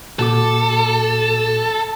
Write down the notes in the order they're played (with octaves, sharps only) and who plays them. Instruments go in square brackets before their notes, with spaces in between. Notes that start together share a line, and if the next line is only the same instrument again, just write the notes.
[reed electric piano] A#2 F#4 D6 [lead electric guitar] A4